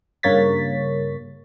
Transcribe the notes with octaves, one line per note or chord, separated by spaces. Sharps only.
G2 C#3 A#3 C#5 A6 B6